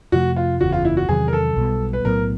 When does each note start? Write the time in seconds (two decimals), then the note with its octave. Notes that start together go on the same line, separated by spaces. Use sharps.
0.12 F2 C3 F3 A3 F#4
0.36 F4
0.61 F#1 E2 C#3 F#4
0.73 F4
0.85 E4
0.97 F#4
1.09 E2 C3 D#3 F#3 G#4
1.28 A#4
1.33 A4
1.56 B1 B2 G3
1.93 B4
2.04 B1 A2 F#3 B3 A#4